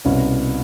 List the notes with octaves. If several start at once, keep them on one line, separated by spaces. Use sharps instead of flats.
C2 B2 B3 C#4